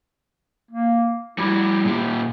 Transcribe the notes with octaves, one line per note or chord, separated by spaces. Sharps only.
A#3
G3 E4 F#4 G4
A#2 G4